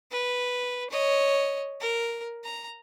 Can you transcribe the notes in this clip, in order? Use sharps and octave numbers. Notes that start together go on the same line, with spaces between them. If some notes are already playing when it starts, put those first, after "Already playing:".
B4
C#5 D#5
A#4
A#5